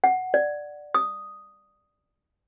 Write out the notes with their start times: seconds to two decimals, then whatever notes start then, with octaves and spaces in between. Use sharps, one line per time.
0.04 F#5
0.34 D5
0.94 D#6